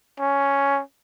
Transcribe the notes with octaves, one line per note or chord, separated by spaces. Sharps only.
C#4